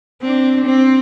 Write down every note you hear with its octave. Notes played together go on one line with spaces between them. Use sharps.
C4 D4
C4